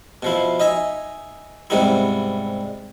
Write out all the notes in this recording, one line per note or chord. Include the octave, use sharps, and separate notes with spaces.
B2 F3 E4
D#4 D#5 E5 G#5
G#2 C3 G3 B3 D#4 E4